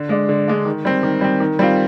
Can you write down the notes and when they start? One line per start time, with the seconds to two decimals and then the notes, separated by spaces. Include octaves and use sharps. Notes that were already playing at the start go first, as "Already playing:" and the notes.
Already playing: D3
0.09 G#3 D4
0.29 D3
0.48 G#3 D4
0.65 D#3
0.85 G3 C4
1.03 D#3
1.21 G3 C4
1.40 D#3
1.59 G3 C4 F4